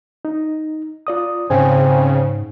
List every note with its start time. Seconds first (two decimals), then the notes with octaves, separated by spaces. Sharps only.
0.25 D#4
1.07 F4 D5 D#6
1.50 G#2 C#3 C4 G#5